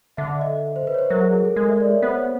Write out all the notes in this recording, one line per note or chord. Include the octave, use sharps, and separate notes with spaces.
D3 E5
D#5
C5
B4
C#5
C5
F#3 A#4
G#4
G#4
A4
G#3 A#4
E5
D5
C#5
B3 C5
C#5